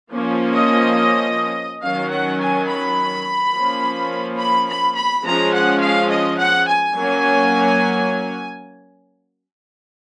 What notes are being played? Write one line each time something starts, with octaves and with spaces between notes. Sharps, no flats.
F3 A#3 C#4
D#5
D#3 F#3 C#4 F5
F#5
G#5
B5
F3 A#3 C#4
B5
B5
B5
F3 G#3 C#4 A#5
F#5
F5
D#5
F#5
G#5
F#3 A#3 C#4